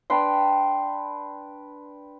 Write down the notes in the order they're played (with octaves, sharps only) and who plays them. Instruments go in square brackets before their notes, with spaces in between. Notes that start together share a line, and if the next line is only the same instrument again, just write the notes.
[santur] D4 B4 G5 C6